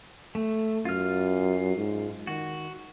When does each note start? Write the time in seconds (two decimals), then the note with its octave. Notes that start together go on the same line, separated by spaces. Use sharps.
0.35 A3
0.85 F#2 F4 F6
1.77 G#2
2.27 D#3 F#4